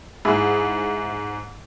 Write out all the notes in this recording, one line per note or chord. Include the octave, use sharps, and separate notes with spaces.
G#2 E4 G#4